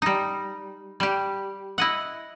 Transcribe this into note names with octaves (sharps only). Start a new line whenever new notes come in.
G3 D#4
G3 G4
E4 D#5 F#5